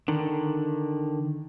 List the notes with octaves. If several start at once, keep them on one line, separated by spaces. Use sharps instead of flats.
D3 D#3